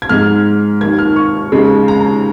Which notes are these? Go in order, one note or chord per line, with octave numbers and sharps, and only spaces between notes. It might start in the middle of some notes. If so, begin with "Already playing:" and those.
G#6
G#2 G#3 F6
D#2 D#3 A#3 G#6
F6
C#6
D#2 C#3 G#3
A#5